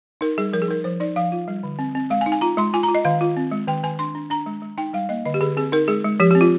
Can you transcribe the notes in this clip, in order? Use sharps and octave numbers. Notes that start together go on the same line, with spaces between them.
D#4 A#4
G3 G#4
F3 A#4
G#4
D#4 A#4
F3 C5
D#4 D5
F3 F5
F4
G3
D3
C4
C4
G#3 F5
G#5
D#4
G#5
F4 A#5
G#3 C6
F4 G#5
A#5
F4
D#5
D#3 F5
F4
C4
G#3
D#3 G5
D#3 G#5
D4 C6
D4
D4 A#5
G#3
G#3
D#4 G5
G3 F5
A#3 D#5
D3 D#5
G4
D3 G#4
C4 G#4
D#4 A#4
G#3 G#4
G#3
F3 G4
C4 G4
F4